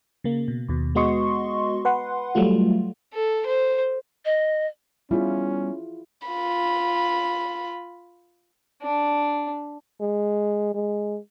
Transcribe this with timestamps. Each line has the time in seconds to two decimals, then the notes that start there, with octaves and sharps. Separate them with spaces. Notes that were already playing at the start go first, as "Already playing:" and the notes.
0.24 C#3 A#3
0.48 B2
0.69 D#2 B2
0.95 G#3 B3 F#4 D#5 C6 C#6
1.85 B4 F#5 C6
2.35 F#3 G3 A3 F4
3.13 A4
3.46 C5
4.25 D#5
5.11 G3 B3 C#4 E4 F4 G#4
6.28 F4 B5
8.82 D4
10.01 G#3
10.75 G#3